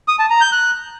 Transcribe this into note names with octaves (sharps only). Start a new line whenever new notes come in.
D#6
A5
A#5
G6
F#6